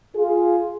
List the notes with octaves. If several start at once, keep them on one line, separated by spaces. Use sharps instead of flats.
F4 G#4